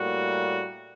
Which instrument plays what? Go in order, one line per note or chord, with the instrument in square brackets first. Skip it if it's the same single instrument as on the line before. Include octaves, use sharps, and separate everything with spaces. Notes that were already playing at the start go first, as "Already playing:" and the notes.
Already playing: [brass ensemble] A2 G3 A#3 F#4